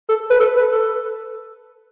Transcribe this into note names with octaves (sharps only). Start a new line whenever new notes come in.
A4
B4
A4
B4
A4